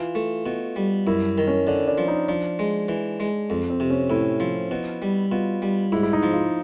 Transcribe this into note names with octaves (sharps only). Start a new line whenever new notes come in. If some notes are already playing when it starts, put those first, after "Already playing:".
Already playing: E3 F4
A3
B2
G3
F#2 E4
D#3
C#4
D3 D4
D4
F3
D#4
F3 D4
G#3
E3
G#3
F2
C4
C3
C#4
A2 E4
F3
B2
G3
B2 F4
G3
G#2 E4
E4
D#4
F3
F4